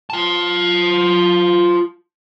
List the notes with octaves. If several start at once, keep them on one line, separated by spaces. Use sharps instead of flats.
F4 A5